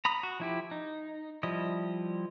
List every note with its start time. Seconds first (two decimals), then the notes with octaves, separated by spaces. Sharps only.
0.05 A#5 B5 D#6
0.23 F#4
0.40 F3 E4 G4
0.71 D#4
1.43 F3 G3 E4 D#5